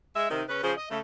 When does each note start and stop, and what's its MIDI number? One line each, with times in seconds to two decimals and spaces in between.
0.15 0.27 56
0.15 0.27 76
0.30 0.42 48
0.30 0.42 51
0.49 0.63 49
0.49 0.63 61
0.49 0.63 71
0.63 0.74 49
0.63 0.74 53
0.63 0.74 68
0.63 0.74 72
0.76 0.86 75
0.89 0.99 49
0.89 0.99 57